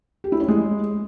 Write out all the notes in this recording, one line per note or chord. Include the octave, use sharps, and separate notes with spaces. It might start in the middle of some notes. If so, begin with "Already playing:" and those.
G4
E4
C#4
G#3